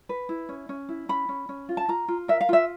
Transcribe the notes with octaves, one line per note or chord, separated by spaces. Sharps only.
B4
E4
C#4
C#4
E4
C#4 B5
C#4
C#4
F4
A5
F4 A#5
F4
A#4 E5
F5
F4 E5